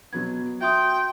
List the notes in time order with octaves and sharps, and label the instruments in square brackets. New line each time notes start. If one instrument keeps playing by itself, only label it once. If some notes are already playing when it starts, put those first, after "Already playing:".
[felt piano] B2 F#3 B3 [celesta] G#6
[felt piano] F#4 [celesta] E5 C6 D#6 [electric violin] G5